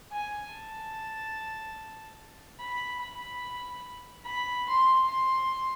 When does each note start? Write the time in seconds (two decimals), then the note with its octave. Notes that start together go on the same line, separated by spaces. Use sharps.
0.12 G#5
0.53 A5
2.60 B5
3.02 B5
4.26 B5
4.68 C6
5.08 C6